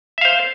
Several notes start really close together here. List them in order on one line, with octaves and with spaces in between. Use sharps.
E5 F5 C5